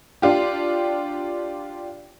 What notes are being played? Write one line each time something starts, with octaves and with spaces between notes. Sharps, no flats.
D4 F4 G4